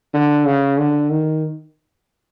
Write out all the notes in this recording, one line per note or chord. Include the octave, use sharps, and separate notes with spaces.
D3
C#3
D3
D#3